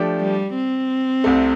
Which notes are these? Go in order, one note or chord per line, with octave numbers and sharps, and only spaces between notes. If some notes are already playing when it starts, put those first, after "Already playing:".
Already playing: F3 A3 D4 G4
G3
C4
C2 C3 A3